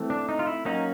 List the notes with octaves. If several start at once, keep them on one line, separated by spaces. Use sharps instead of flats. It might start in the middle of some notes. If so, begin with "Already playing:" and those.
Already playing: E3 A3 C4
D4
D#4
F4
E4
F#3 A#3 C#4 D#4